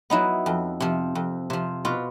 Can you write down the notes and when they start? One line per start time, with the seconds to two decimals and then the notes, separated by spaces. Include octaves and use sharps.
0.10 F#3 B3 D#4 E4
0.46 F2
0.80 C3 F3
1.15 F2
1.50 C3 F3
1.85 B2 F4